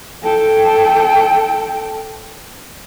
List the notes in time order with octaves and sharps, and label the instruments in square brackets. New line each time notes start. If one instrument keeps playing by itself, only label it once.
[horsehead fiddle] A4 G5